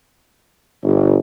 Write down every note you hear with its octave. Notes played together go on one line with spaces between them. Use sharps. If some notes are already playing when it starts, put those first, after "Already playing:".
G1